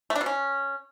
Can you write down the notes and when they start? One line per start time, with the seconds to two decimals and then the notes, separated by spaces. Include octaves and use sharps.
0.10 A3
0.15 D4
0.21 B2
0.26 C#4